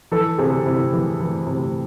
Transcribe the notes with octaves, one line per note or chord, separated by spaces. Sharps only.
E3 A4
C3 G#4
C3 E4
E3
E3
C3